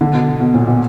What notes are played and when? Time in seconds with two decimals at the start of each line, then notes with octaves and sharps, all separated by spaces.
0.01 D3
0.14 B2
0.40 B2
0.54 A#2
0.67 B2